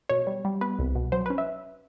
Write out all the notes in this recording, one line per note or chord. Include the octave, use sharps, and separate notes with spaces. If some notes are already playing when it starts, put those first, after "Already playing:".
B2 C#5
G3
G3
B3 B4
C2
B2
F#3 C5
B4
C#4
E5